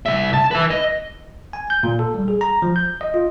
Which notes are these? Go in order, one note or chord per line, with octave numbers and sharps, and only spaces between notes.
C2 E5
A5
B4 E5
D#5
G#5
G6
A#2
A4
G3
G#4
A#5
F3
G6
D#5
F4